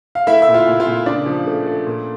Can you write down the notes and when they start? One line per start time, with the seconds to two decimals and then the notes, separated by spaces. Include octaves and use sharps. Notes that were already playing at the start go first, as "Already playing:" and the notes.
0.15 F5
0.27 A3 E4 E5
0.42 E5
0.48 A#2
0.54 F4 F5
0.67 A#2
0.80 F4 F5
0.87 A#2
1.06 C#3 D4 D5
1.26 F3
1.47 A3
1.67 A3
1.87 A#2